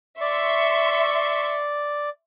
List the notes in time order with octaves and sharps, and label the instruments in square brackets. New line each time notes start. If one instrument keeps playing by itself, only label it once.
[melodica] D5 [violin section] E5 C6 C#6